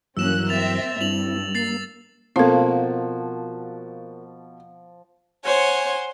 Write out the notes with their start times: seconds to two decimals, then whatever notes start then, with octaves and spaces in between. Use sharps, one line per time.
0.17 G2 E3 F#3 A#3 C#4 E6 F#6 E7
0.49 C4 E5 A6 F7
1.01 G2 C4 E4 F7 F#7
1.55 A#3 A6 C7
2.36 B2 F3 A#3 C4 F#4 A4
5.44 C5 C#5 F#5 G#5